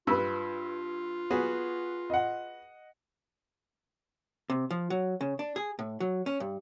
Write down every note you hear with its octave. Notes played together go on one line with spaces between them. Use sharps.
G2 F4 B4 E6
B3 F#4 G#4
D#5 F#5
C3
F3
F#3
C#3
D4
G#4
A2
F#3
C#4
G2